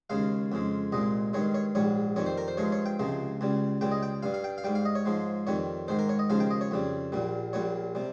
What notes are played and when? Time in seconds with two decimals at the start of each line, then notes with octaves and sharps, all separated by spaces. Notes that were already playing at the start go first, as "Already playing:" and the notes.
0.10 D#2 C#3 G#3 F5
0.52 F2 C#3 G#3
0.92 C2 A#2 G#3 D#5
1.33 G2 D#3 G#3 C#5
1.54 C#5
1.75 A#1 G#2 G3 C#5
2.16 F2 D#3 G3 C#5
2.26 C5
2.38 A#4
2.48 C5
2.57 G2 F3 G#3 C#5
2.72 C#5
2.86 G5
2.99 C#2 C3 F3 G#3
3.41 C#2 C#3 G3
3.81 C#2 C#3 G3 G5
3.92 D#5
4.03 G5
4.23 G2 G3 F5
4.34 F5
4.44 G5
4.58 F5
4.64 G#2 G3 G5
4.75 F5
4.85 D#5
4.95 C#5
5.05 G#2 F3 G#3
5.47 F2 D#3 G3 C#5
5.88 G#2 D#3 G#3 C5
5.99 A#4
6.09 C#5
6.19 D#5
6.30 D#2 C#3 F3 G#3 F5
6.40 G5
6.51 D#5
6.61 C#5
6.71 F2 C#3 G3
7.12 A#1 A#2 G3
7.53 A#1 A#2 G3 C#5
7.95 C3 G3